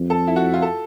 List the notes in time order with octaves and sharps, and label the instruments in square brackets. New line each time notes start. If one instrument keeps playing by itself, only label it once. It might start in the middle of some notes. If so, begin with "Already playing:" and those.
Already playing: [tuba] F2
[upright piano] A4
E4
F#4
F4
A4